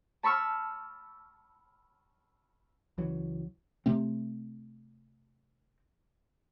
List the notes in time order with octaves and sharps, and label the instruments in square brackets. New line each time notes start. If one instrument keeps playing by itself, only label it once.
[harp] A5 B5 C#6 E6 F6
[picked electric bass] C#2 E3 F#3
[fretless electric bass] C3 A3 C4